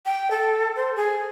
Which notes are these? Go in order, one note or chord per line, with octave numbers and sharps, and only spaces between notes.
G5
A4
C5
G#4